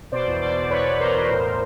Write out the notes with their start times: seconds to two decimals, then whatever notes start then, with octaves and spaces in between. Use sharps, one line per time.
0.12 B2 C5 D5
0.27 E2
0.41 B2 C5 D5
0.56 B2
0.70 E2 B4 C#5
0.85 E2
0.94 B4
0.99 E2 A#4 C5
1.14 E2
1.29 A2
1.44 A2